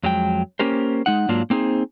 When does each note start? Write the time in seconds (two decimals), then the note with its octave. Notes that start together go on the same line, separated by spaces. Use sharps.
0.04 F2 F#3 G#3 G5
0.59 A#3 C#4 G4 A#4 C5
1.06 G#3 D#4 F#5
1.29 G#2 F#3 A#3 D4 F4
1.50 A#3 C4 D#4 G#4 C5